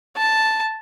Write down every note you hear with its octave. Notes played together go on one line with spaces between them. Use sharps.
A5